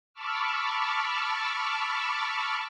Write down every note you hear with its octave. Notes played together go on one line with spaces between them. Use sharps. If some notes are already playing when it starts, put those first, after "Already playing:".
A5 B5 C#6 D6 E6 F6